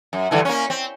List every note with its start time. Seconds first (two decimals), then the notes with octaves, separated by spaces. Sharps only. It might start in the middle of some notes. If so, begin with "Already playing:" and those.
0.13 F#2
0.31 G2 D3 E3
0.45 A#3 C#4
0.70 C4